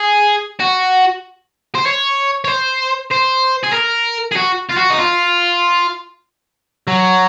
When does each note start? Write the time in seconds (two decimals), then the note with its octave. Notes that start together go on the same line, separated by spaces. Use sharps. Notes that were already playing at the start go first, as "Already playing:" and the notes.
Already playing: G#4
0.60 F#4
1.75 C5
1.86 C#5
2.45 C#5
2.48 C5
3.11 C5
3.64 G#4
3.73 A#4
4.32 G#4
4.37 F#4
4.71 F4
4.78 F#4
4.91 D#4
4.99 F4
6.87 F#3